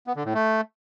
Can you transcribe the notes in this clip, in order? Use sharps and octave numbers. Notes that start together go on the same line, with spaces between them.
B3
D3
A2
A3